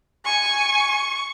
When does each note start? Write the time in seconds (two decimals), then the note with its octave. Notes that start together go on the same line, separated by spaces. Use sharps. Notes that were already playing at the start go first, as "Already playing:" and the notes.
0.25 G#5 C#6